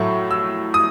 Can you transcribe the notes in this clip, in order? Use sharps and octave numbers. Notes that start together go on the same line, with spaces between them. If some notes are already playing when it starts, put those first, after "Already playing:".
Already playing: A2 F#3 A3 C#6
E6
D#6